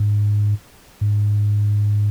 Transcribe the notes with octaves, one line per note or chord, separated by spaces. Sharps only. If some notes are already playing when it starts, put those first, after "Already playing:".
Already playing: G#2
G#2